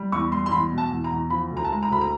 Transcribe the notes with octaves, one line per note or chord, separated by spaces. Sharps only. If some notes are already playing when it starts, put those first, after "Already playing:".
Already playing: G3
E2 C#6
G3 C6
C6
E2 B5
B2
A5
E2
A#5
E2
F3 B5
D2
A#5
A5
G#3 A#5
A#5
D2 B5
A#5